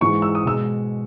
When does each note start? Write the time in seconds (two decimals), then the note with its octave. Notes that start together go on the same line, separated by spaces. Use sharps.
0.01 G#2 E3 G#3 C#6
0.22 E6
0.35 D#6
0.45 B2 G#3 E6